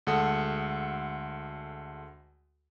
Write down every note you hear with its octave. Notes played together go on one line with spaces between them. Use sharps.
D2 G#3 A4 F#5 D#6